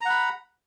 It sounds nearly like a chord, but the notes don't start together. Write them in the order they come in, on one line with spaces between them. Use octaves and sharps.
A#5 F#5 B5